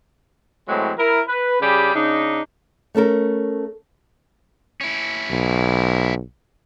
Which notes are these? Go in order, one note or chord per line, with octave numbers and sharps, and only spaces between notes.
A2 E3 F#3 G#3 C4
E4 A#4
B4
C#3 G3 G4 G#4 B5
C#3 D4 D#4
A3 C#4 A4 A#4
C#4 E4
B1